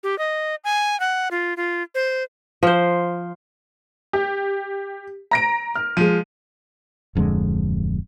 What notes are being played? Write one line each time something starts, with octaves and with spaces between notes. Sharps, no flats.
G4
D#5
G#5
F#5
F4
F4
C5
F3 C5
G4
A#5 A#6 D7
F6
F3 G#3 D#7
D1 F2 D3 G#3